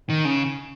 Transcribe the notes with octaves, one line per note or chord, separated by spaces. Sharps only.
D#3
C#3